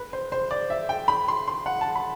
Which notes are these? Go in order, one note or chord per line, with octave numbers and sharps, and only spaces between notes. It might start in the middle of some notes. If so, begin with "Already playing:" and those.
Already playing: B4
C5
C5
D5
E5
G5
B5
C6
C6
F#5
A5
B5